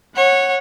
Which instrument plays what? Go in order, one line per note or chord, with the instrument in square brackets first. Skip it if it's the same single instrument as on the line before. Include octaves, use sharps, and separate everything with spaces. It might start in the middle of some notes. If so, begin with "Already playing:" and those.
[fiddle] C#5 [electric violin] F#5